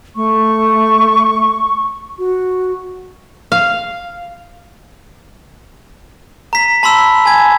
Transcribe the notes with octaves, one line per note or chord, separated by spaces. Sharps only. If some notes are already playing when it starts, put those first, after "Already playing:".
A3 C#6
F#4
F5
A#5 B6
A5 B5 C6 E6 E7
G#5 G#6